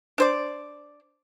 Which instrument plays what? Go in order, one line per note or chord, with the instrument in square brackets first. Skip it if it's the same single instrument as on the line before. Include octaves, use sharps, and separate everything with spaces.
[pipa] D4 C5 D5